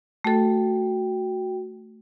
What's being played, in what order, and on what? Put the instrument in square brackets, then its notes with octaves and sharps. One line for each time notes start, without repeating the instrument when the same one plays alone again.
[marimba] A3 A4 [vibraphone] F#4 G5